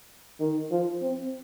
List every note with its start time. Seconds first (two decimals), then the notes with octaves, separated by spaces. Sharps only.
0.40 D#3
0.71 F3
1.02 C4